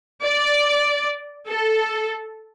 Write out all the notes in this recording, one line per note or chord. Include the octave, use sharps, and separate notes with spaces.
D5
A4